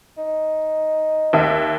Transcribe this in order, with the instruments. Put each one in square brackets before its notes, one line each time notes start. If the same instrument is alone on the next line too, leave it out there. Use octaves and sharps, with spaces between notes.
[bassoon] D#4
[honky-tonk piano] D#2 E5